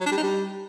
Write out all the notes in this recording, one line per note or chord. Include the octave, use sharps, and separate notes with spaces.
F#3
D4
G3
D#4
G3